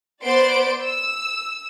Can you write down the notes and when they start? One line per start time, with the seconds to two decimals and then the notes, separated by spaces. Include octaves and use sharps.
0.23 B3 C5 D5 C6 D7
0.83 E6